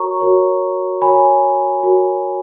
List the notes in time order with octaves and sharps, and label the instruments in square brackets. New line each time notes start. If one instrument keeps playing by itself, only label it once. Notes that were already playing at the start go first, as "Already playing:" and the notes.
Already playing: [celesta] F#4 A#4 C#5 A#5 C#6
F#4 A#4 C#5
F#4 A#4 C#5 G#5 B5
F#4 A#4 C#5